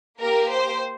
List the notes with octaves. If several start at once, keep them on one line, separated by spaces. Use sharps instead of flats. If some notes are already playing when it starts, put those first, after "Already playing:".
A#3 G4 A#4
C5